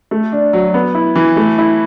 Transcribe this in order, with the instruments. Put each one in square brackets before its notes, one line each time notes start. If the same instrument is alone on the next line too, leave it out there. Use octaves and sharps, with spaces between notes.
[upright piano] A3
D4
F#3
B3
E4
E3
A3
E4